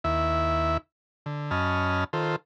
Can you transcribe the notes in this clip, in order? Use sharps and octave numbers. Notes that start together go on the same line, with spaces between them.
D#2 E4 E5
D3
F#2 C#4 D#5 A5 B5 F6
D#3 F4 A4 C5